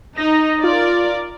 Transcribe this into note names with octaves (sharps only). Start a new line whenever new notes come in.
D#4 A#6
F4 A#4 D5